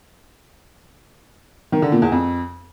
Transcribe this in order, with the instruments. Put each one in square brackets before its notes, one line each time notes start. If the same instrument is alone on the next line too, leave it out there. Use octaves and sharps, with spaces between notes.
[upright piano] D#3
D3
A#2
E2
F2